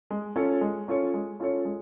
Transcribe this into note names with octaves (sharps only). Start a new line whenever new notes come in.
G#3
C#4 F4 A4 C#5
G#3
C#4 F4 A4 C#5
G#3
C#4 F4 A4 C#5
G#3